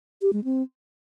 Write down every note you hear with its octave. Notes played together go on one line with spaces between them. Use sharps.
G4
G#3
C4